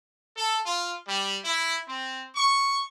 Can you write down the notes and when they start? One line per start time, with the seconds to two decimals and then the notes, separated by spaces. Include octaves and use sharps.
0.36 A4
0.65 F4
1.07 G3
1.45 E4
1.88 C4
2.35 C#6